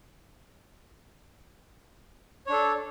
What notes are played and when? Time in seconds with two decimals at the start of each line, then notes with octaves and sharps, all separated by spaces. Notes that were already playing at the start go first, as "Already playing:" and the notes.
2.46 C#5
2.49 D4
2.52 A4